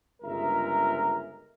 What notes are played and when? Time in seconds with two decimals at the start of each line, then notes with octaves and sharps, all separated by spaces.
0.22 G1 C#2 G#3 A#4 E5 A#5